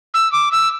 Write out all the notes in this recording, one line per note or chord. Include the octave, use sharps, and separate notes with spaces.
E6
D6
E6